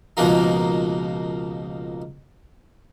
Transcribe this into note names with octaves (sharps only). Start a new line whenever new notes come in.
C#2 B2 F3 A#3 D#4